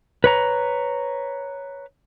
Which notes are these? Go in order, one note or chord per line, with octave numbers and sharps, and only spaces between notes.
B4 C#5 A#5